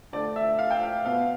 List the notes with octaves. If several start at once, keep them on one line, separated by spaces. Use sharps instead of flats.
D3 A3 D5
E5
F5
G5
F5
B2 B3 F5